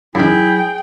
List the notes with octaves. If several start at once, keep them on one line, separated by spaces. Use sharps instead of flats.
F#2 D#3 F#3 E4 G#4 G5